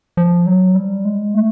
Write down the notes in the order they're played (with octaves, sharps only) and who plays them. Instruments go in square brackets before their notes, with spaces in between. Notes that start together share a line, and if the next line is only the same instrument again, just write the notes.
[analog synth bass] F3
F#3
G3
G#3
A3